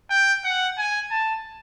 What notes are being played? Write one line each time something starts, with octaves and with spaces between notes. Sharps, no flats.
G5
F#5
G#5
A5